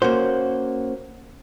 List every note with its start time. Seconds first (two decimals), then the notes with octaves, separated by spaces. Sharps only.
0.02 A#3 C#4 F#4 C5